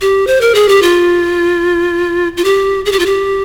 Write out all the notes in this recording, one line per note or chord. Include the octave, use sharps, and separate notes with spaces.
G4
C5
A#4
G#4
G4
F4
F4
G4
G#4
G4
F4
G4